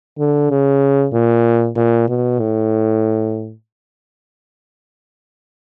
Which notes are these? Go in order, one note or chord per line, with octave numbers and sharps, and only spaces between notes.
D3
C#3
A#2
A#2
B2
A2